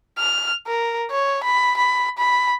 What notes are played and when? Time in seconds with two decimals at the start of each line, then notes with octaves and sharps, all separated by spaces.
0.18 F6
0.67 A#4
1.11 C#5
1.44 B5
1.77 B5
2.18 B5